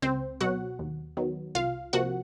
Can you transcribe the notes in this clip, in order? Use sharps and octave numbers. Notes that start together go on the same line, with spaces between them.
C#2 C4 C5
B2 F#3 F#4 F#5
D#2
D#3 F#3 B3
C2 F4 F5
C3 F3 A#3 F#4 F#5